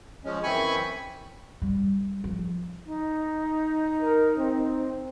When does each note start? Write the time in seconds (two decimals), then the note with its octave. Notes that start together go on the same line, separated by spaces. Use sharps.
0.25 F3 G#3 C#4
0.43 F#2 E3 C4 G#5 B5 C#6
1.62 G3
2.24 F3
2.86 D#4
4.02 A#4
4.37 C4